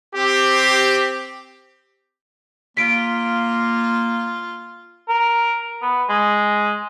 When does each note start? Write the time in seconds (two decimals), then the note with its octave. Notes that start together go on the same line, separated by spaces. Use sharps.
0.16 C4 G4
2.77 A#3 F4 B6 D7
5.09 A#4
5.82 B3
6.09 G#3